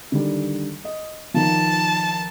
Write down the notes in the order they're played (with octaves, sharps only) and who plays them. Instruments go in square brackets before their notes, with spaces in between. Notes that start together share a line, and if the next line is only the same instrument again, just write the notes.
[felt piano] D3 D#3 G3
D#5
[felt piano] D#3 F3 [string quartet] A5